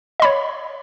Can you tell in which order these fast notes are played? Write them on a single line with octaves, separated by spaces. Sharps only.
D#5 B5 C#5